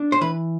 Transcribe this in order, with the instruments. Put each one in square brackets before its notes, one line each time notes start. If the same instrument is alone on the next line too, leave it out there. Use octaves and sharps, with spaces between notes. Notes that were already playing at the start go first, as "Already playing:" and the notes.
Already playing: [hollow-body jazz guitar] D4
C5
E3 B4